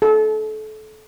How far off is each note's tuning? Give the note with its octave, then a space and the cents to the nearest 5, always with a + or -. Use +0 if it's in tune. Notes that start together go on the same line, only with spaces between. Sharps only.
A4 -30